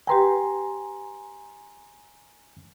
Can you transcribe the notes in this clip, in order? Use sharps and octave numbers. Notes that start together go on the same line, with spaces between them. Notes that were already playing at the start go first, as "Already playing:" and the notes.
G4 B4 G5 G#5 A#5 C6